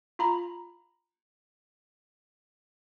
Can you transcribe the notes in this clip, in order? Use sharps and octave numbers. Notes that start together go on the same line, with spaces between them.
F4 A#5 B5